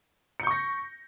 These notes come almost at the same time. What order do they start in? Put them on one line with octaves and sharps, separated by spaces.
C#7 G6 C#6 A#6